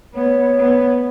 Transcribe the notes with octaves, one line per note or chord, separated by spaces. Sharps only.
B3 C#5
B3